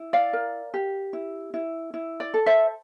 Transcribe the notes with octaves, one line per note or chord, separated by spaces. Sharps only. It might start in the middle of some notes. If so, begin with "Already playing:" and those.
Already playing: E4
D5 F5
A#4
G4
E4
E4
E4
D5
A4
C5 E5